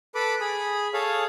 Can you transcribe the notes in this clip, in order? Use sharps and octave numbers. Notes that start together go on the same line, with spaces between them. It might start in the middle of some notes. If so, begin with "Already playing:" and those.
A4 B4 B5 D6
G#4 B5
G#4 A4 C#5 F5